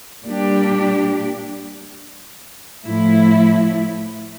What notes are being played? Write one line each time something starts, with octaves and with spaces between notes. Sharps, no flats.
A#2 G3 D4 G4
A2 F3 A3 E4